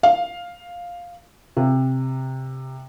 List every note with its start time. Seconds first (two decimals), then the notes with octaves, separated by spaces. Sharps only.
0.03 F5
1.57 C3